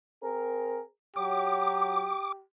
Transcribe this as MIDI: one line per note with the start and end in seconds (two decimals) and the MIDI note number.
0.22 0.80 60
0.22 0.80 68
0.22 0.80 70
1.16 2.10 54
1.16 2.43 67
1.16 2.32 86